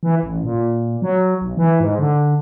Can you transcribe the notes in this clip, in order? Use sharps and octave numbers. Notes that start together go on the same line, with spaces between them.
E3
A1
A#2
F#3
B1
E3
G#2
D3